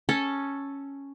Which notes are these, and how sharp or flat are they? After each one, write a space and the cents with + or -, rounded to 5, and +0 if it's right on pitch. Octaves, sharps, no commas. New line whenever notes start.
C#4 +0 A4 +0